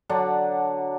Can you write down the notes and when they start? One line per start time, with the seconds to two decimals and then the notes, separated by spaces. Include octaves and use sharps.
0.09 D3 F#3 D4 F#5